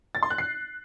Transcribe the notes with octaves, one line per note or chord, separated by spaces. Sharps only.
A6
C6
F#6
C7